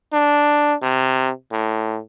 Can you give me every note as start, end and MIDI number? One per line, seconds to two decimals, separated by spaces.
0.13 0.74 62
0.82 1.31 48
1.52 2.00 45